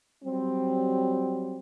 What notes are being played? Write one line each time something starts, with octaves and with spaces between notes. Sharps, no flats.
F#3 G3 C4